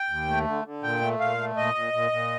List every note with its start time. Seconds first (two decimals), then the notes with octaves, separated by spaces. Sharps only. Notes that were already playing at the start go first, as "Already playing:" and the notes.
Already playing: G5
0.10 D#2
0.28 A3
0.47 D3
0.65 D3
0.83 A#2 G5
1.01 A3
1.20 A#2 F5
1.38 A3
1.56 A#2 D#5
1.75 A#2
1.93 A#2
2.11 A#2